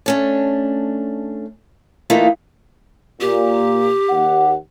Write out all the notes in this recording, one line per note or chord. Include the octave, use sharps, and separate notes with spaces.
A3 C#4 D4
E3 A3 A#3 D#4 F4
A#2 G4
D#2 F#5